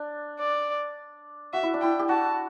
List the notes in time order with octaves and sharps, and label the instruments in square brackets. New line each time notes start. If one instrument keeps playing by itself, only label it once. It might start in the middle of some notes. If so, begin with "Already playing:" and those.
Already playing: [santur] D4
[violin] D5
[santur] F#4 [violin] E5
[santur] E4
D4
[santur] E4 [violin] G5
[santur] G4
[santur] F#4 [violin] A5